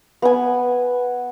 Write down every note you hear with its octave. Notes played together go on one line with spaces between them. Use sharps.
B3 G#5